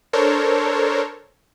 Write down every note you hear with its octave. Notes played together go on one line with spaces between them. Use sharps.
D4 A4 A#4 C5 C#5